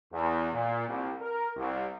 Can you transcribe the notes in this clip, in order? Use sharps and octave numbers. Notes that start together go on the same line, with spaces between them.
E2
A#2
C2
A#4
C2